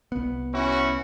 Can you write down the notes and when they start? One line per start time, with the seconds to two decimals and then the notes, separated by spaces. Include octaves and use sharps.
0.12 C2 B3
0.54 C#4 E4 F#4